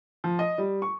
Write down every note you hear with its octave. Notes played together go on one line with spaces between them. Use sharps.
F3
D#5
G3
C#6